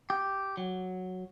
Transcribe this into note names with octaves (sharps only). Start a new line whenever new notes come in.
G4
F#3